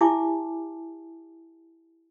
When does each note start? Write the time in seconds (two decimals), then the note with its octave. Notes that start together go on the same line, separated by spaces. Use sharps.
0.01 E4 G4 E5 G#5 A5 D6